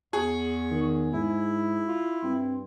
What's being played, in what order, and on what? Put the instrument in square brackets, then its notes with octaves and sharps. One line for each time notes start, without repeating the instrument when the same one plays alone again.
[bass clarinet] E2 [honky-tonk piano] G#4 [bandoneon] C#6
[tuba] D#3
[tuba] G#2 [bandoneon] E4
[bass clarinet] F4
[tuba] G2 [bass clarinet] C4